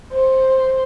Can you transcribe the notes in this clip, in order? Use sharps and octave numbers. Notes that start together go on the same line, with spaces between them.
C5